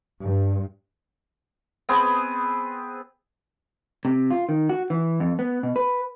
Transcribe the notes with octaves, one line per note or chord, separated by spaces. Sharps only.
G2
B3 C4 G#4 B4
C3
F4
D#3
F#4
E3
F2
B3
B2
B4